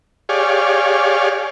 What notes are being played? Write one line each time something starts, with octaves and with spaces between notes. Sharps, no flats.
G4 G#4 C#5 D5 F5